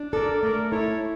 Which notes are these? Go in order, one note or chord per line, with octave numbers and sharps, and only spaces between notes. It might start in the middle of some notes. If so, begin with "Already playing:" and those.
Already playing: D4
A4 A#4 D5
A3 A#4 D5
E4 A4 C#5